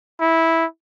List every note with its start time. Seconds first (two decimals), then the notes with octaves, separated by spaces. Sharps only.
0.21 E4